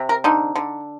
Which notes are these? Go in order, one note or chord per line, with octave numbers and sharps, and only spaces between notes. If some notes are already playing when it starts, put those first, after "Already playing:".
Already playing: C3
A#4
D3 D#4
D3